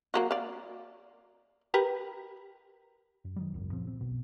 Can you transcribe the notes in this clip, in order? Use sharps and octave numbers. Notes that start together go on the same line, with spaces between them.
F#3 A#3 F#4
D5 F5
G4 A#4 B4
F#2
D#3 F#3 G3
G#1 C#2 F#2
C#2 A#2 F3 C4
C4
B1 F2 B2